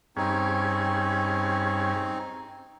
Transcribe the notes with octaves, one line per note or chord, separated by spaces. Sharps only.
G2 C4 C#4 D#4 G#4